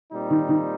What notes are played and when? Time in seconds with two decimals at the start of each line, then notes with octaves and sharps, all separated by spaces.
0.12 A#2 G3 C4 D#4
0.30 D#3
0.49 D#3